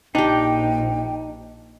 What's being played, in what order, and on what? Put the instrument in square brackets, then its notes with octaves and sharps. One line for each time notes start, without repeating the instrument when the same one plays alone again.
[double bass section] A#1 [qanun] D4 G4 [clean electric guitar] D#4 [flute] G5